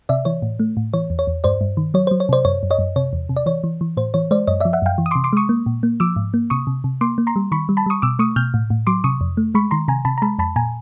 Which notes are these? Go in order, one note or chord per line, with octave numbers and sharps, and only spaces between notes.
C3 D5 E5
E3 C#5
A2
A3
A2
E3 C#5
E2
C#5
E2
G2 C5 D5
G2
D#3
F#3 C#5
F#3 C5
C#5
C3 C5 D5
F#2 C#5
F#2
C#5 D#5
F#2
C3 C#5
E2
C3
D5
E3 C#5
E3
E3
A2 C5
E3 C#5
G#3 C5 D5
F#2 C#5 D#5
F3 D5 E5
E5 F#5
F#2 F5 G5
E3
D#6
C6 D6
C3
C6 D6
G#3 C#6 D#6
A#3
A#2
A#3
F3 D6 E6
G#2
A#3
C3 C#6 D#6
C3
C3
A#3 C6 D6
A#3
A#5 C6
G3
D#3 B5 C#6
G3
A5 B5
G3 C#6 D#6
B2 D6 E6
A3 C#6 D#6
B2 F6 G6
A2
A2
F#3 C6 D6
C3 C#6 D#6
F2
A3
G#3 B5 C#6
D#3 A#5 C6
C3 G#5 A#5
C3 A5 B5
A#5
G#3 A5 B5
F2 A5 B5
A#2 G#5 A#5